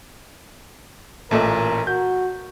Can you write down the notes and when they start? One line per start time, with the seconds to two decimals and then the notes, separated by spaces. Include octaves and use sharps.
1.31 A1 A#2 A3 A4 A#4 D#5
1.87 F#4 G6